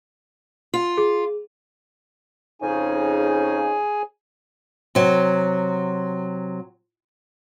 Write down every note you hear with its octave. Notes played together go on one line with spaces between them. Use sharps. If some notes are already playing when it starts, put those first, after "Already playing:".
F4
G#4
F2 C#3 D#4 G#4 G#5
C3 F#3